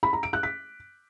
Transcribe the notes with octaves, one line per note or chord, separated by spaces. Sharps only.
B5
A#5
D7
F#6
B6